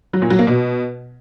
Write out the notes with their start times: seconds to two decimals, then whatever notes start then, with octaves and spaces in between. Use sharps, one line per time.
0.13 F#3
0.22 A#2
0.30 F#3
0.39 A#3
0.47 B2